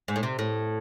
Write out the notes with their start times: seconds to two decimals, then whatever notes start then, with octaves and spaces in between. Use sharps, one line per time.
0.08 G#2
0.16 A2
0.23 C3
0.39 A2